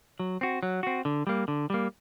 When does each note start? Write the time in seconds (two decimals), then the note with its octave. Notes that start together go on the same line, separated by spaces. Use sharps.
0.19 F#3
0.41 C4 F#4
0.63 F#3
0.83 C4 F#4
1.05 D3
1.27 G3 A#3
1.48 D3
1.70 G3 A#3